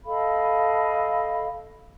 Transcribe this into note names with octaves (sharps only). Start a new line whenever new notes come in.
A4 D#5 F5 B5